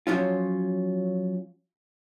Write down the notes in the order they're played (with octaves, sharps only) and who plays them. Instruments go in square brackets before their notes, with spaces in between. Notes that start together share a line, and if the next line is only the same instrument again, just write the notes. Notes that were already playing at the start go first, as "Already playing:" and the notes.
[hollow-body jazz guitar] F3 F#3 C#4 F4